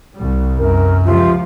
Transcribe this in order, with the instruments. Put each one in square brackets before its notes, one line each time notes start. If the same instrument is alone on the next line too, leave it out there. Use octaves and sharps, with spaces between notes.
[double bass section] C2 G3
[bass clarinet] F#2 [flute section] A#4
[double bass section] C#2 F3 [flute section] F4 G4 E5